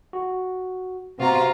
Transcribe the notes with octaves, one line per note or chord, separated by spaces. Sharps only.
F#4
C3 B3 C4 F4 F#4 A#5